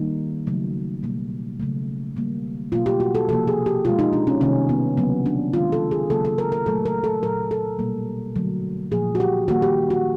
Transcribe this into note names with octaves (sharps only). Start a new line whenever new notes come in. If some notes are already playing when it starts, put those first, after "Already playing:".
Already playing: D#3 G3 A#3 D#4
C#3 F#3 A3
B2 G3 A#3
C#3 F#3 A3
D#3 G3 A#3
B2 F#3 A#3 F4
G4
F#4
A4
C3 F3 A#3 A4
G#4
G4
B2 G#3 F4
D#4
D4
C#4
C3 D#3 G3 A#3 C#4
B3
C#3 F#3 A#3 B3
D4
D#3 G#3 F4
A4
G#4
C#3 F#3 A#3 A4
A4
A#4
A#4
A#2 F#3 A3 A4
A#4
A4
A#2 F#3 A3 A#4
A4
B2 G3 A#3
D3 F#3 A3
A#2 F3 A#3 G#4
F#4
G4
D#3 G3 A#3 F#4
G4
F#4